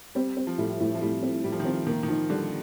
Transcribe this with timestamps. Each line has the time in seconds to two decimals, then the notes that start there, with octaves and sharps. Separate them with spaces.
0.15 G3 C4
0.37 C4
0.47 F3
0.58 A2 G3
0.80 A2
0.95 F3
1.01 A2 G3
1.22 C4
1.44 A2 G3
1.52 F3
1.60 D#3
1.65 F3 C4
1.87 D#3 A#3
2.03 D#3
2.08 F3 D#4
2.30 D3 G3